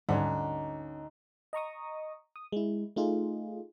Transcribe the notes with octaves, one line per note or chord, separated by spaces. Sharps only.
D2 G#2 G3 C#4 D#4 F#5 D6
D#5 A#5 C#6 D#6
D#6
G#3 E4
A3 D#4 F4 G#4